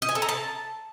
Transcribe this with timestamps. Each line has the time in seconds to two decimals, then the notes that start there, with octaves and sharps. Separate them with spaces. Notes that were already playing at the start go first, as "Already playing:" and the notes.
0.02 D#5
0.09 G#5
0.15 A4
0.22 A#5
0.29 A5